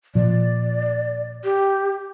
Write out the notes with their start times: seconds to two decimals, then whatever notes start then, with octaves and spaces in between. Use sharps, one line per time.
0.15 A#2 F3 D5
1.44 G4